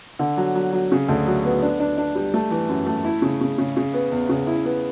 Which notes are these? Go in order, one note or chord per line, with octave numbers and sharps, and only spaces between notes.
D3
F#3
F#3
F#3
C#3
D2
F#3
B3
D4
D4
D4
G3
A3
E3
F#2
A3
E4
C#3
C#3
C#3
C#3
B3
E2
C#3
E4
B3